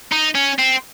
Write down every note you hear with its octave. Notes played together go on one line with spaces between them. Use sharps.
D#4
C#4
C4